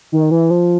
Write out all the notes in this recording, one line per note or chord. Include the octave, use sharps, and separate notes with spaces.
D#3
E3
F3